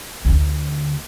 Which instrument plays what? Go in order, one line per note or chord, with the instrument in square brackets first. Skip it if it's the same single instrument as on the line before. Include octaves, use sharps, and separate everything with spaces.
[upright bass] D2